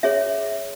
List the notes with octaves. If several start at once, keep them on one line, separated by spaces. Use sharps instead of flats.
C#4 G#4 C#5 E5